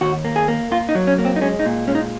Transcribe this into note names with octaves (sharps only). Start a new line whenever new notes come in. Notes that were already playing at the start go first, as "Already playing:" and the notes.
D#2 F#4
A#3
G#4
A#3
A#3 F4
D#4
F#3
C#4
A#3
C4
D#4
G#3 C#4
D#4
A#2
G#3 C#4
D#4